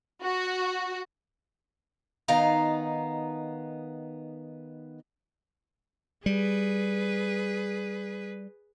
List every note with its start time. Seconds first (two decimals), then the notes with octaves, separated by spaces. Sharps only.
0.23 F#4
2.28 D#3 B3 D#4 F5 A#5
6.26 G3 G#4 B4